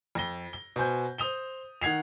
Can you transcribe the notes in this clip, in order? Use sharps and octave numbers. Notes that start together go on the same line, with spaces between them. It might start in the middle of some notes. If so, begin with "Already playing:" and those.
F2 A#6 G7
G7
B2 C5 G#5 G6
C5 D#6 F7 G7
D#3 F#5 G#6 C7 F7